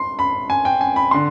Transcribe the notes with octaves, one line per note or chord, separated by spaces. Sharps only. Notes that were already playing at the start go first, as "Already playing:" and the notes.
Already playing: C6
B5
G#5
G5
G#5
B5
D3 C6